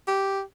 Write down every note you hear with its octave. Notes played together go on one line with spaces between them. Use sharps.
G4